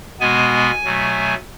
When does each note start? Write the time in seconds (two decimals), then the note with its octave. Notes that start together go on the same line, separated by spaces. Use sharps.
0.20 B2 G#3 B3 G#5
0.84 B2 F#3 A3